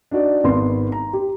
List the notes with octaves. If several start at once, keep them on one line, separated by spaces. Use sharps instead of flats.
D4 D#4 F#4 D5
G#1 B3 C6
A#5
G4